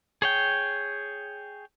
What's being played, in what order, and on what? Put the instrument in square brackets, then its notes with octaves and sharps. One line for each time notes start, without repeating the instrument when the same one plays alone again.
[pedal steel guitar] G#4 C#5 G5